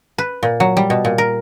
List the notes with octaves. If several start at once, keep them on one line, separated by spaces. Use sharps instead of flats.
B4
A#2
F#3
G3
B2
A#2
A#4